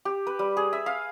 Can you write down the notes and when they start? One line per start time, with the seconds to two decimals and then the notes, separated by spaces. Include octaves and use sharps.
0.05 G4
0.27 B4
0.39 G3
0.57 G#4
0.73 E5
0.86 F5